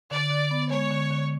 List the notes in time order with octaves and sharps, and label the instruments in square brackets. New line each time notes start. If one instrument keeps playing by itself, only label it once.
[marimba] D3 [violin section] D5
[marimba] D3
B3
[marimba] G#3 [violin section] C#5
[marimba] D3
D3